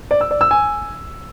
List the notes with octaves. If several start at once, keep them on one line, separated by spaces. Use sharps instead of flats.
D5
E6
D5
E6
G#5